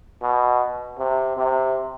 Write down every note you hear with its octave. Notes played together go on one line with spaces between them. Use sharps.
B2
C3
C3